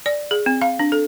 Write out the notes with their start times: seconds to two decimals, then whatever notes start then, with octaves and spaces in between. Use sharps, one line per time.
0.06 D5
0.31 G#4
0.46 C4
0.61 F5
0.79 D4
0.92 A4